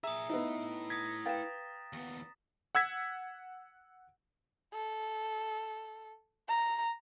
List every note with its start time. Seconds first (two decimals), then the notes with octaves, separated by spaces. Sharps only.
0.04 A#2 G#4 E5 A#5 D#6
0.30 B3 D#4 E4 A4
0.90 D#6 G#6 A#6 B6
1.26 B4 F5 G5 A6 E7
1.93 D#2 B3
2.75 F#5 E6 G#6 B6
4.73 A4
6.48 A#5